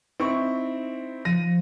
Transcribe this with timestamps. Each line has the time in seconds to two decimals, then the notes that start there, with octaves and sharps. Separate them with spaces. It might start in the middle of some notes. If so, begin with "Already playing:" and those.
0.20 C4 D#4 E4 C#6
1.25 F3 A#6 D#7